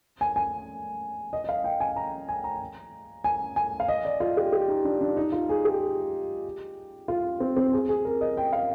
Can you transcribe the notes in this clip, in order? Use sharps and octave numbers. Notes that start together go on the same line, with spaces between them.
G#5
G#5
D#5
D#5
F5
G5
G#5
A#5
G#5
A#5
G#5
G#5
F5
D#5
D5
F4
G4
G4
D#4
D4
D4
D#4
F4
G#4
G4
F4
C4
C4
G#4
G#4
A#4
D#5
G5
F5